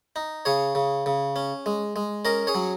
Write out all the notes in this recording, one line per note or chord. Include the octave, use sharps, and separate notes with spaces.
D#4
C#3 G#4 C#5
C#3
C#3
C#4
G#3
G#3
C#4 A#4 D#5
G#4 C#5
F#3